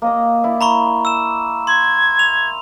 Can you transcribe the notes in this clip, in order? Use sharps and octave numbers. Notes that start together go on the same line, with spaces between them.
A#3 D#5 A#5
E4 D5
A#5 B5 C#6
E6 E7
C6 G#6
F7